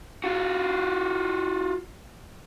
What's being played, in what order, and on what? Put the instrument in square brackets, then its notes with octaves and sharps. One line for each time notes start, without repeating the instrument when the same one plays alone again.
[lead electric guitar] F4 F#4